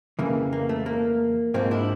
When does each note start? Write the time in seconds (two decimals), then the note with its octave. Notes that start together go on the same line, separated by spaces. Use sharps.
0.19 F2 C#3 E3 A#3
0.53 A#3
0.69 A3
0.86 A#3
1.54 G#2 F3 A#3 C4
1.71 D4 E4